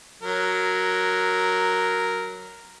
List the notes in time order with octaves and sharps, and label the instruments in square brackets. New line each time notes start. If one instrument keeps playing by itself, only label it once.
[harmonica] F#3 A#4